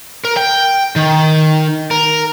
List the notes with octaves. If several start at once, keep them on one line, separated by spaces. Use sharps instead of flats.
A#4
G5
D#3
A#4